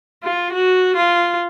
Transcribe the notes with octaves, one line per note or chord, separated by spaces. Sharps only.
F4
F#4
F4